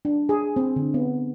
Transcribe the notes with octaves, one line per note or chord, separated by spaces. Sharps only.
D4
G#4
C4
D3
B3